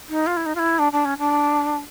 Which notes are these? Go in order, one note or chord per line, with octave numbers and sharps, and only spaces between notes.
D#4
F4
E4
D#4
F4
E4
D4
D4
C#4
D4